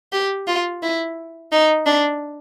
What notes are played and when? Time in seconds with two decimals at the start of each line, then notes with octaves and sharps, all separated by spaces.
0.12 G4
0.47 F4
0.83 E4
1.52 D#4
1.86 D4